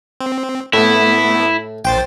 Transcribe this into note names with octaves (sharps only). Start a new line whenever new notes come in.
C4
A2 A3 B3 E4
A#1 C5 G5 A6